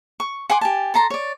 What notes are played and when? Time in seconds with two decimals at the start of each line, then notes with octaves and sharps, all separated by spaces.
0.20 C#6
0.50 F#5 G#5 C6 D6
0.61 G4 G#5 A5
0.94 A4 A5 A#5 C6
1.10 C#5 D5